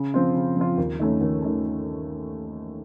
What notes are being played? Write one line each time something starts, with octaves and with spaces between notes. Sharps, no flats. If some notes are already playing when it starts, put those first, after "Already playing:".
Already playing: C#3
F3 C4 F4
C#3
F3 C4 F4
D#2
D#3 A3 C#4
D#2
D#3 A3 C#4